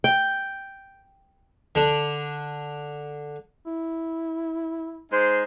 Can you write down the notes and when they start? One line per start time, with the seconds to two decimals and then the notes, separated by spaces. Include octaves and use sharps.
0.04 G5
1.75 D3 D4
3.66 E4
5.11 G#3 D#4 C5